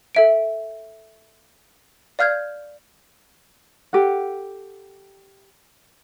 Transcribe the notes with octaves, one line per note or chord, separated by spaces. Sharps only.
A4 E5 D7
D5 F5 F6 G6 G#6
G4 A4 F#5